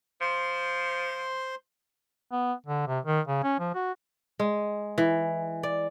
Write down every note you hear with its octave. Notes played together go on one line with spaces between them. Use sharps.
F3 C5 C6
B3
D3
C3
D#3
C#3
C#4
F3
F#4
G#3
E3
D5